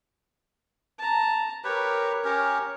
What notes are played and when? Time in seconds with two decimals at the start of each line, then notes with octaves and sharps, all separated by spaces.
0.98 A5 A#5
1.64 G4 A#4 B4 C#5
2.24 C#4 G4 A#4 C#5